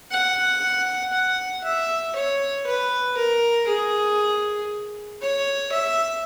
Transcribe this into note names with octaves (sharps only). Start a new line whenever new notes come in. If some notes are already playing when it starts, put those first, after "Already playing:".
F#5
F#5
E5
C#5
B4
A#4
G#4
C#5
E5